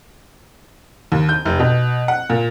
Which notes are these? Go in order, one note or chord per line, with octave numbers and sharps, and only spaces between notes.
D#2
G6
F1
B2
F#5
A#2